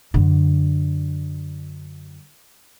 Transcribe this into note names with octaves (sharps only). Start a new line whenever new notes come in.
F#2 D3